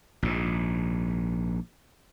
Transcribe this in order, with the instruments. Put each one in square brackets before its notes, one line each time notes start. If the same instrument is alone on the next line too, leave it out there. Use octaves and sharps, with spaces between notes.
[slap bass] A#1 G#2